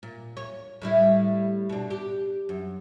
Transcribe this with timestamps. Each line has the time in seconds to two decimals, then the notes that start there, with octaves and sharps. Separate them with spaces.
0.03 A#2
0.37 C#5
0.82 A2 G3 E4
1.69 B2 D4
1.90 G4
2.49 F#2